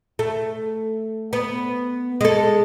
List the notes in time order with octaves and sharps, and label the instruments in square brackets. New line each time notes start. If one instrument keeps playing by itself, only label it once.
[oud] A3
B3
G#3 A4